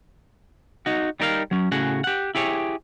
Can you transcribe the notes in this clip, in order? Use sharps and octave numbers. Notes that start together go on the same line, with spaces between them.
D#4 F#4
G3 D#4 A#4 D#5 F5
F#3 C#4
A2 C#3 F#4 G#4 F#5
G4 F#5
E4 G4 G#4 C#5